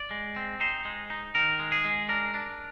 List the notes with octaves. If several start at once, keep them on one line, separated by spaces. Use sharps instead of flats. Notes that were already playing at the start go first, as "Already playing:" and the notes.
Already playing: D5
G#3
C4
D#4 C5
G#3
D#4
D#3 A#4
G#3
G#4
G#3
D4 A#4
D4